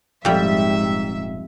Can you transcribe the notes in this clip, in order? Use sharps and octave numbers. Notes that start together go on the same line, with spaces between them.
D#1 F2 G#2 G3 E5